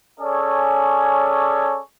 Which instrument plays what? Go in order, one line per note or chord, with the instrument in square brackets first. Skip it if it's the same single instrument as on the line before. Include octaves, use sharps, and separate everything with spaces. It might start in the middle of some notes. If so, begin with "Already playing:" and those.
[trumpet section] C#4 G#4 A4 C#5 D5 G#5